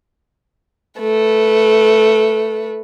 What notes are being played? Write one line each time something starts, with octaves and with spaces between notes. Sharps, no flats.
A3 B4